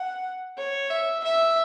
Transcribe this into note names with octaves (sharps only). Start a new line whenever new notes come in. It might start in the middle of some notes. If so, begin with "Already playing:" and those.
Already playing: F#5
C#5
E5
E5